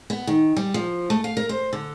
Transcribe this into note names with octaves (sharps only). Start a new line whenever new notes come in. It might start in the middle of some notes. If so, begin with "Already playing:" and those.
B3
D#3
G3
F3
A3
F5
A#4
C5
D3